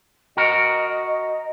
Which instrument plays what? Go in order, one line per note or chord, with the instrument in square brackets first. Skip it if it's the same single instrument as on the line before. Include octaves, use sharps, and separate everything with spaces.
[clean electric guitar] F#4 A#4 [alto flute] D#5